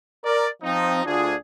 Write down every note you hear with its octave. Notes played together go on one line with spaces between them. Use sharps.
A#4 D5
F3 C4 D#4
D2 D4 F4 G#4